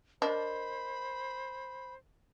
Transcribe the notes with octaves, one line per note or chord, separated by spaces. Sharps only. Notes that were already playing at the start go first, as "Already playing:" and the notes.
D4 A#4 C5 D#5 B5